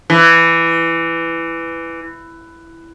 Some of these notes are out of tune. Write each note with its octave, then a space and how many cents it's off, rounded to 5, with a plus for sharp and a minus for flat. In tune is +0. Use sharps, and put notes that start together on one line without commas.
E3 +10